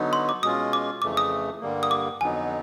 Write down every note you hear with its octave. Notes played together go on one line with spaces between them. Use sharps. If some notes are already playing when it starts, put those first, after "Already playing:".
Already playing: D3 F#3 B3 D#4
C6
D6
B2 G#3 C#4 F4 D#6
D6
F2 C#3 E3 A3 D6
D#6
G2 D3 G3 A#3
D#6
D6
F2 D3 F#3 B3 D#4 G#5